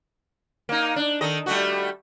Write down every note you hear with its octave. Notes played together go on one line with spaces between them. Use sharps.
A#3 D#4
D4
D#3 A4 D#5
G3 A3 F#4